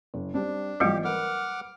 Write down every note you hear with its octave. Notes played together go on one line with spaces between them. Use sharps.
F#1
G3 C4 D4
G#1 E3 F#3 G3 A3 F4 G4
A#4 B4 F#5 D6 F6